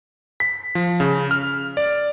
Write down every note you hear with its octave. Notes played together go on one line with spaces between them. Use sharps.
B6
F3
C#3
F6
D5